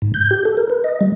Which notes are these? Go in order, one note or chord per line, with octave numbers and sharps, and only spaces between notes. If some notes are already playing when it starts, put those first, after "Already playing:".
G#2
G6
G4
A4
A#4
B4
D#5
G3